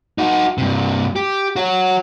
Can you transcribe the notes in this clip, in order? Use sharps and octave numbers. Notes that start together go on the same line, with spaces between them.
D#4 F#4
G2 C3
G4
F#4 C#5